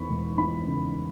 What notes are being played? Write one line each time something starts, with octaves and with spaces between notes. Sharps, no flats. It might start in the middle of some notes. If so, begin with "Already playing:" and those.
Already playing: E2 B5 C#6
E1
E3 B5
C#3